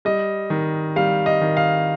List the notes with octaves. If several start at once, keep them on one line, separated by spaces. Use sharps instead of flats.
G3 D#5
D#3
G3 F5
D#5
D#3
F5